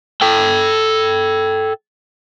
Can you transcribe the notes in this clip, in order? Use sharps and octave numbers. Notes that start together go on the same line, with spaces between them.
A4 G5